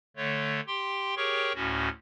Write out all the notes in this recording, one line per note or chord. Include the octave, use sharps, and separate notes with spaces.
D3 A3 C#5
G4 G5 C6
G4 G#4 A#4 C#5 G5 C#6
D2 A2 C#4 F#4